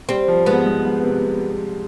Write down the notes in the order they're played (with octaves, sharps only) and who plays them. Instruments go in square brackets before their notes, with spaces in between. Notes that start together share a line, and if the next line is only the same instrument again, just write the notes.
[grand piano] G3 [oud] C4
[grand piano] F3
[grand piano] G#2 [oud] B3
[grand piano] G#2
G#2
C3